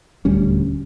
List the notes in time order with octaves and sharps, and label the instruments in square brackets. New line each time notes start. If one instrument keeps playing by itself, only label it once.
[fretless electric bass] D#1 D2 G3 C#4